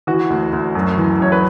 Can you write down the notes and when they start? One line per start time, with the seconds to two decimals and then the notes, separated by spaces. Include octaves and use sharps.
0.07 E3 F#4
0.30 D2
0.53 D2
0.75 F#2
0.98 E3
1.20 F#2 C#5
1.32 B4